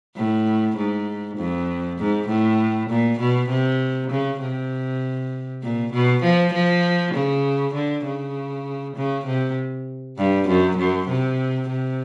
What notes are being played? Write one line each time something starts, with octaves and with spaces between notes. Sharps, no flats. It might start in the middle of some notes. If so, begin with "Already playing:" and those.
A2
G#2
F2
G#2
A2
A#2
B2
C3
C#3
C3
A#2
B2
F3
F3
C#3
D3
C#3
C#3
C3
G2
F#2
F#2
C3
C3